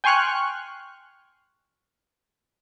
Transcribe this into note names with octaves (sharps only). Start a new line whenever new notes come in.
G5 G#5 C6 C#6 F6 F#6